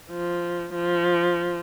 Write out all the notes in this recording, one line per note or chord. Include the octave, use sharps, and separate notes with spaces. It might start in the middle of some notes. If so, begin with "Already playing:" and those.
F3
F3